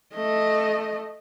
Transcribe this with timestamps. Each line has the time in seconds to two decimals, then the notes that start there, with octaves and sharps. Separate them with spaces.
0.15 A3 D#5